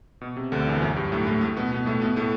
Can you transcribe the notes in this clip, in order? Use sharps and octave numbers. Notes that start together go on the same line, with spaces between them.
B2
C3
D2 D3
E2 E3
F#2 F#3
G2 G3
A2 A3
A2 A3
A2 A3
B2 B3
B2 B3
A2 A3
B2 B3
A2 A3